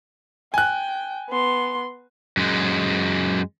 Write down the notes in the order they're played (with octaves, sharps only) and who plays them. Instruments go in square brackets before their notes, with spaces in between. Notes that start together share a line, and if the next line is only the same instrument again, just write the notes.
[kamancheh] G5 [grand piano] G#5 F#6
[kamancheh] B3 C6
[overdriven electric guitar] F#2 G#3